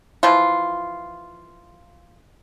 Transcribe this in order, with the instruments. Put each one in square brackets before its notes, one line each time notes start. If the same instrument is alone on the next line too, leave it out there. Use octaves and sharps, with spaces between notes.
[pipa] E3 F3 F4